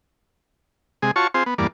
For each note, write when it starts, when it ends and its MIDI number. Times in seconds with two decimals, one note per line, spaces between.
1.02 1.11 48
1.02 1.11 56
1.02 1.11 68
1.16 1.27 65
1.16 1.27 66
1.16 1.27 73
1.16 1.27 81
1.16 1.27 85
1.34 1.44 60
1.34 1.44 65
1.34 1.44 68
1.34 1.44 72
1.46 1.54 59
1.58 1.67 40
1.58 1.67 43
1.58 1.67 58
1.58 1.67 74